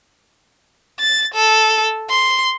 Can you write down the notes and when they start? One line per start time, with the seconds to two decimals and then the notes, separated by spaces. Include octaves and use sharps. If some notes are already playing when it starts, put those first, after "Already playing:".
1.00 A6
1.34 A4
2.10 C6